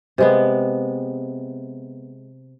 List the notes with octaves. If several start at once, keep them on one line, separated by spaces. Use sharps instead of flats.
C3 G#3 B3